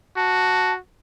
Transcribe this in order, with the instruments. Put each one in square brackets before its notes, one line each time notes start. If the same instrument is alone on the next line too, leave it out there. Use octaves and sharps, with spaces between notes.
[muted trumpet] F#4 [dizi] A5